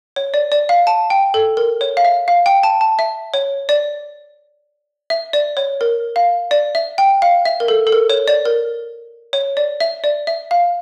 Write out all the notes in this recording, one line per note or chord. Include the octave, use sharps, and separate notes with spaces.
C#5
D5
D5
F5
A5
G5
A4
A#4
C#5
F5
E5
F5
G5
A5
A5
E5
C#5
D5
E5
D5
C#5
A#4
F5
D5
E5
G5
F5
E5
A#4
A4
A4
A#4
C#5
D5
A#4
C#5
D5
E5
D5
E5
F5